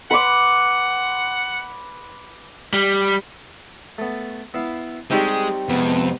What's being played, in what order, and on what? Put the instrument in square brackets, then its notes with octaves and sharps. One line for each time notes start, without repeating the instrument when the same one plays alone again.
[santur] B4 C6 D6 [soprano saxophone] F#5
[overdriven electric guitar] G3
[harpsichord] A3 B3
B3 E4 F5
[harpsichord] G3 C#6 D#6 [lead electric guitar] G#3 [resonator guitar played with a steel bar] C4 D#4 G4
[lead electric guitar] F2 [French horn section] C3 G#3 B3